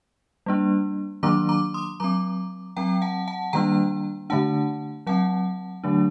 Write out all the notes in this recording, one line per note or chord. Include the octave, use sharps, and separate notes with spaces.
G3 A#3 D4
D#3 F#3 A#3 D4 A#5 D6
A#5 D6
C6 D#6
F#3 C4 A#5 D6
F#3 C4 G5 A#5
F#5 A5
F#5 A5
D#3 G3 A#3 D4 G5 A#5
D3 A3 D4 F#5 A5
F#3 C4 F#5 A5
D3 F#3 A3 D4